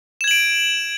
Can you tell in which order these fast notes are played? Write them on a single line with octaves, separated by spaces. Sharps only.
E7 G#6 F#7 D7